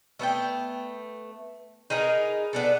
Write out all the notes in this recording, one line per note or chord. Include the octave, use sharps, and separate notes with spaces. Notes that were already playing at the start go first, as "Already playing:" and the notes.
A3 B3 E5 G5
D#4 G#4 A#4 B4
B3 D4 A4